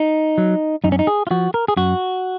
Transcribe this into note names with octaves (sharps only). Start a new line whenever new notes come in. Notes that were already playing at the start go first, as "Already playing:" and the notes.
Already playing: D#4
F#3
F#2 D#4
C#4
D#4
G#4
F4
F3 F#4
A#4
G#4
F#2 F#4